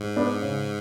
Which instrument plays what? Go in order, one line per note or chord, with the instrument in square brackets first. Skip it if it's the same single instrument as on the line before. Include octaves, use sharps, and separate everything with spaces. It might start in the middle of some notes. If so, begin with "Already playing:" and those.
Already playing: [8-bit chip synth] G#2
[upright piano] B3 D4
C#3